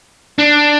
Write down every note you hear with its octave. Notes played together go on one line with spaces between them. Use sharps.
D4